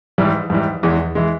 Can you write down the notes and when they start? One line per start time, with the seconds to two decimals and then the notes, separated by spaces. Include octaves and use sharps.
0.18 G#2 E3 G3
0.50 G#2 E3 G3
0.83 E2 E3 G#3
1.15 E3 G#3